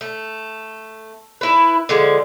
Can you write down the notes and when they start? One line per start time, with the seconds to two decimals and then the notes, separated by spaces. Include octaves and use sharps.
0.01 A3
1.41 E4 B4
1.89 D3 F3 G#3